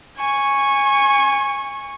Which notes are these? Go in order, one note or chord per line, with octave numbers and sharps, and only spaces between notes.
G#5 C#6